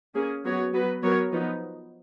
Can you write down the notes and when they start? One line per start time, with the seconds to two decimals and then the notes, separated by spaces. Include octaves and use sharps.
0.15 A#3 C#4 G#4
0.44 F#3 B3 F#4 C#5
0.74 F#3 B3 F#4 B4
1.03 F#3 B3 F#4 A#4 C#5
1.32 F3 B3 D#4